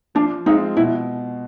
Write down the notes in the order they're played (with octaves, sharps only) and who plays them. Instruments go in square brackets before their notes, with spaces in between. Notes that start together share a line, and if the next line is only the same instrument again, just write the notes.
[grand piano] F3 [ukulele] D4
[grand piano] G#3 C4 F4 [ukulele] D#4
[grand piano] B2 [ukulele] E4